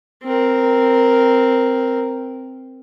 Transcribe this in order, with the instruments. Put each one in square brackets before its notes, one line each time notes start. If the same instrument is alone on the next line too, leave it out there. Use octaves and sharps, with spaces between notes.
[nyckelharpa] C4 A#4